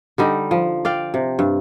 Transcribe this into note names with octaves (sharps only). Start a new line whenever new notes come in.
D3 G3 D#4
F3
D5 F5 G5
C3
G2